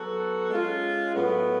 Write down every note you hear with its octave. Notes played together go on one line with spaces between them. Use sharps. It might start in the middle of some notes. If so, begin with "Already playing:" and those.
Already playing: F#3 B3 F#4 A4
G#3 C#4 F4
A2 F#3 B3